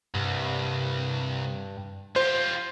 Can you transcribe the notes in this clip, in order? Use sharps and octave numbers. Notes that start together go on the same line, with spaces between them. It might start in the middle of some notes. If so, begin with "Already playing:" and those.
C2 G2
F4 G4 C5